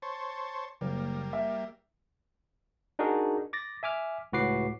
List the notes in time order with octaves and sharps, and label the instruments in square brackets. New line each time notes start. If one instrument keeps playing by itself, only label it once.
[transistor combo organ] C5 C#5 A5
[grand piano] F#1 [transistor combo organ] G3 A#3
[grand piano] E5
[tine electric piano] D4 D#4 F#4 G#4 A#4
D6 A6 A#6
E5 G#5 D6 F6
C#2 A2 F#4 B4 D6 C7